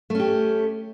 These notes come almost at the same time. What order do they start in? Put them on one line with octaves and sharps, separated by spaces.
A3 C#4 G4